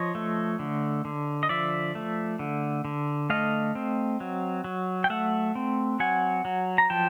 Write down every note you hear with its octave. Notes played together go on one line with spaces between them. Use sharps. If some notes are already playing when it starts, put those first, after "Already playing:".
Already playing: F3 C#5 D#5
A3
D3
D3
D#5
F3 D5 E5
A3
D3
D3
A3 D#5 F5
C4
F#3
F#3
G5
A3 E5 F#5
C4
F#3 F#5 G#5
F#3
A#5
F3 G5 A5